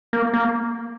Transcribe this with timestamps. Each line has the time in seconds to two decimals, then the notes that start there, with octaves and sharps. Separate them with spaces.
0.13 A#3
0.33 A#3